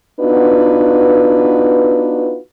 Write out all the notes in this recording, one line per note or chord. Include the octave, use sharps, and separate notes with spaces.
B3 D4 D#4 F4 F#4 B4